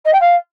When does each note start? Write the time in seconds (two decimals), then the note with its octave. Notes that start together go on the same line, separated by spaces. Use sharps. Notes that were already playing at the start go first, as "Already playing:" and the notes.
0.05 D#5
0.13 G5
0.21 F5